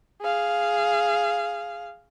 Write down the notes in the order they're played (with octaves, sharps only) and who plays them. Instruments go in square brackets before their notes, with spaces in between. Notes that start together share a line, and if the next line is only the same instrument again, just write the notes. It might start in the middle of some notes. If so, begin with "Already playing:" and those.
[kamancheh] G#4 F5